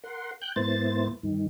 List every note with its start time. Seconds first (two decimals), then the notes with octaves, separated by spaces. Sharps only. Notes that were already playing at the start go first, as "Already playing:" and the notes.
0.04 A#4 F#5 C6
0.42 G5 F#6 G6
0.56 G#2 A#3 B3 E4 C5 A6
1.23 G2 D#3